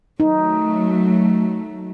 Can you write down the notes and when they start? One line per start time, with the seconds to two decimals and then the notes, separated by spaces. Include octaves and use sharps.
0.20 F#3 A3 D#4